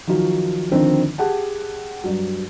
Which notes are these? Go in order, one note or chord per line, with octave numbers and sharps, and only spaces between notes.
D#3 F3 F#3 F4 F#4
D3 D#3 F3 C4 D4
G4 G#4 F#5 A5
G2 F#3